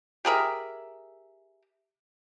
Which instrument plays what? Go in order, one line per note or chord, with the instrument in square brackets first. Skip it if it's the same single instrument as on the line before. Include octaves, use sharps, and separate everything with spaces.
[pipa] G4 G#4 A#4 E5